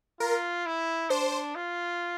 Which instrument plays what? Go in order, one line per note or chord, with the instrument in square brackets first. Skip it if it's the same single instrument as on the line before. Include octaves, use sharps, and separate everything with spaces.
[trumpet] F4 [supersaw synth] A#4
[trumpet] E4
[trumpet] D4 [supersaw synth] C5
[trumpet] F4